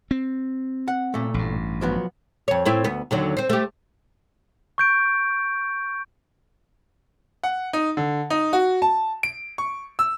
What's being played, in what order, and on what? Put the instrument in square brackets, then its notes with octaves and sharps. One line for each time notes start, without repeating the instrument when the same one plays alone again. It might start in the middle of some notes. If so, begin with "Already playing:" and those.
[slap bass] C4
[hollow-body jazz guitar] F#5
A#2 A3
[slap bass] A1 G2
[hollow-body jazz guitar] F3 F#3 B3
[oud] F2 C#5
A2 C4 E4
D2 B3
D#2 D3 F#3
C4 C5
A3 G4
[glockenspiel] C#6 G6 D7
[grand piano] F#5
D#4
D3
D#4
F#4
A5
D7
C#6
E6